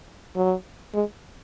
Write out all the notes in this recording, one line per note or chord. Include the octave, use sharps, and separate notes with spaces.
F#3
G#3